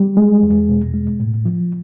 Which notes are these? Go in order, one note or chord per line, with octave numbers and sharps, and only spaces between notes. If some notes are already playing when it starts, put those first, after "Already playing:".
Already playing: G3
G#3
E2
B2
G#3
A2
F3